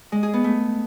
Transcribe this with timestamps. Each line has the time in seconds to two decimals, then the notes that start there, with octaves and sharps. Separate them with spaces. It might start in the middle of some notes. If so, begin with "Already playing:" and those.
0.12 G#3
0.23 G#4
0.33 B3
0.44 A3